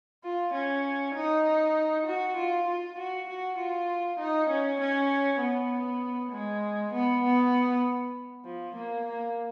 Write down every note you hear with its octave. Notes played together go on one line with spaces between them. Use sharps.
F4
C#4
D#4
F#4
F4
F4
F#4
F#4
F4
D#4
C#4
C#4
B3
G#3
B3
B3
F3
A#3
A#3